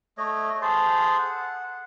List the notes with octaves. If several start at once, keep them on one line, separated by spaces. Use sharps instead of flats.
A3 C#5 D#5
G#4 A4 C5 A5
F#5